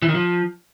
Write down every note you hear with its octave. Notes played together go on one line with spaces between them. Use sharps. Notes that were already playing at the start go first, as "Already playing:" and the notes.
E3
D#3
F3